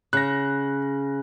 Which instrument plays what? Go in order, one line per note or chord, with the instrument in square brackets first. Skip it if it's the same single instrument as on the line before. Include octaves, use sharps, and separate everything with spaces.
[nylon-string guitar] C#3 [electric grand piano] F#6 A#6